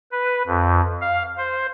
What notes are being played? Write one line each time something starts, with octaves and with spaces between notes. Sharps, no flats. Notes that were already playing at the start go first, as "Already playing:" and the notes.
B4
F2
F5
C5